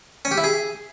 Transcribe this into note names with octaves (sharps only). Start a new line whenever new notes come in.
C#4
G4
E4
G#4